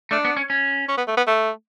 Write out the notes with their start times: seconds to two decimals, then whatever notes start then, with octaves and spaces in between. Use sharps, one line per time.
0.11 A3 D4
0.25 B3
0.37 C#4
0.50 C#4
0.88 C#4
0.97 B3
1.07 A3
1.17 B3
1.27 A3